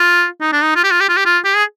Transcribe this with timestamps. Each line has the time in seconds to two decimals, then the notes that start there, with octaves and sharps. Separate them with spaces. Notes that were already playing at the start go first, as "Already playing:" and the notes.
Already playing: F4
0.41 D#4
0.53 D4
0.63 D#4
0.76 F4
0.84 G4
0.91 F4
1.01 G4
1.09 F4
1.17 G4
1.25 F4
1.45 G4
1.56 G#4